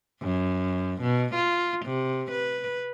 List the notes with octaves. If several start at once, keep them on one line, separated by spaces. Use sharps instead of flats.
F#2
B2
F4
C3
B4